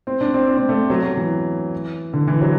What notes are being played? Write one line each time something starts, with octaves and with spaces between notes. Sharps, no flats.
C4
D4
C4
D4
C4
A3
F#3
F#3
E3
D3
E3
F#3